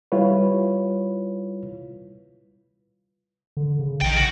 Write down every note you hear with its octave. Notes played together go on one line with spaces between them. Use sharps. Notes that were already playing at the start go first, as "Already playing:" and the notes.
G3 E4 F4 B4 C#5
D3
C#3
A#1 D#4 G5
F#4